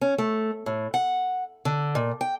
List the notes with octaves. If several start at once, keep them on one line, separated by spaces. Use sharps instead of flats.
C#4
A3
A2
F#5
D3
A#2
G5